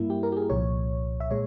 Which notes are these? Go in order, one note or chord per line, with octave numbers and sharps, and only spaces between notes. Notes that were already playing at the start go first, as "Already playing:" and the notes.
Already playing: G2 G3 A#3 E4
G4
A#4
G4
G#4
C2 A#2 F3 C#5
E5
A#2 G#3 C#5